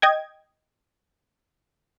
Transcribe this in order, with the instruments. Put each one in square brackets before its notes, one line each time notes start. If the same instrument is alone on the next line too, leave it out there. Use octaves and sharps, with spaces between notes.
[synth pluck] D#5 G5 G#6